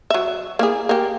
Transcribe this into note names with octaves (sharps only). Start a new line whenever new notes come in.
F#3 E5
A#3 E4 G#4
A#3 G4